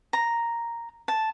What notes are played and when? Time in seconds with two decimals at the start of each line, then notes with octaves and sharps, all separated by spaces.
0.13 A#5
1.08 A5